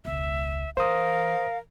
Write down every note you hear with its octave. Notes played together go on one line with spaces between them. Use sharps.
E1 C#2 E5
E3 A#4 C5 F5 D#6